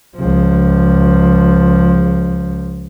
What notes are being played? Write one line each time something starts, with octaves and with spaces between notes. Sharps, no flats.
C#2 F3